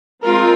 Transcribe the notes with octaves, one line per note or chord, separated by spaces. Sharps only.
F3 G#3 C4 F4 A#4